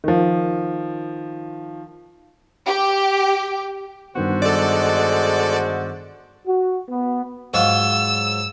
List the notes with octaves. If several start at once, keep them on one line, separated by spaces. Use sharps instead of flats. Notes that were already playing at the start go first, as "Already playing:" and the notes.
D#3 F3
G4
G2 D3 D#3 B3 F#4 C5
G#3 A4 D5
F#4
B3
G#2 F#3 F4 E6